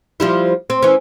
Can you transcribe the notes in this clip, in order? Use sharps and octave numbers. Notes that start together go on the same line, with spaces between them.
F3 G3 E4
C4
E3 C#4